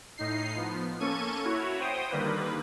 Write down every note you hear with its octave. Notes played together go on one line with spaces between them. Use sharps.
A2 D#4 C7
F3 B3
A#3 C#4 A4 C#6 D#7
E4 F#4 C#5
C5 G5 D#6
D3 D#3 G3 A#3 B4